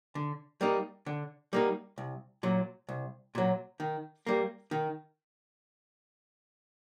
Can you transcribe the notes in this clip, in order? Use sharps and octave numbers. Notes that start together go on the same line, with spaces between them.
D3
G3 A#3 D#4
D3
G3 A#3 D#4
C2
A#2 F#3
C2
A#2 F#3
D#3
G3 A#3
D#3